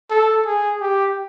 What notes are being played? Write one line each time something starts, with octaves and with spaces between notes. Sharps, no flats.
A4
G#4
G4